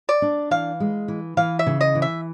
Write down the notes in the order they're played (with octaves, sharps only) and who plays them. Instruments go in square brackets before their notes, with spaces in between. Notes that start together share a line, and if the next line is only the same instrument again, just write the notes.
[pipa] D5
[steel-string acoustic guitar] D4
[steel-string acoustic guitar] E3 [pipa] F5
[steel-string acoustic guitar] G#3
E3
[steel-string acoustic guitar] E3 [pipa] F5
[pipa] E5
[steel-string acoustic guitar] C#3
[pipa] D#5
[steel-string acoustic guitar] E3
[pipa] E5